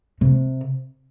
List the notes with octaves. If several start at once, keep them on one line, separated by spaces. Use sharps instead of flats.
C3